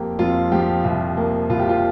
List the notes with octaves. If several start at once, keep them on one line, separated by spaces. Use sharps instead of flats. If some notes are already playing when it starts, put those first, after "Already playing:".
Already playing: F2 A#3 G4
F2 F4
F3 G4
C2
A#3
C2 F4
G4
F4